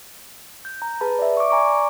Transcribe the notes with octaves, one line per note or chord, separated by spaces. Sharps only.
G6
A#5
G#4 B4 A5 B5
D5 E5
C#6 D6
D5 G#5 A#5 C#6 D6